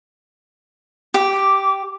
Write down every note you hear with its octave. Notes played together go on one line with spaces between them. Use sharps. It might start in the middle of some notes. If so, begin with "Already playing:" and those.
G4
D6